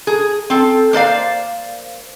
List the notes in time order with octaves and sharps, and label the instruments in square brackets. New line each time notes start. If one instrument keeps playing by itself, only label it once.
[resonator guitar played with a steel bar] G#4
C4 A4
A#3 C5 D5 F5